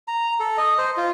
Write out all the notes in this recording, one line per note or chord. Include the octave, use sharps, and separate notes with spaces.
A#5
A4
D#5
C5
F4